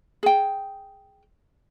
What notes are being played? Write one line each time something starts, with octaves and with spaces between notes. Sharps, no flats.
G#4 G5